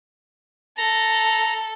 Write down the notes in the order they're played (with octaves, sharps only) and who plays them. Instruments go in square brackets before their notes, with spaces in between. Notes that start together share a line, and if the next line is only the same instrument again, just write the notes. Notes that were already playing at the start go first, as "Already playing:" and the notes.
[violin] A4 [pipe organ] A#5